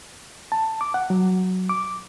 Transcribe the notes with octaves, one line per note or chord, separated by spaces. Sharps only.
A5
D6
F#5
F#3
D6